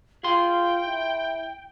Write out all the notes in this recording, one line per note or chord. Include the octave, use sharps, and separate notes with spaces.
F4 G#4 G5 C6
E4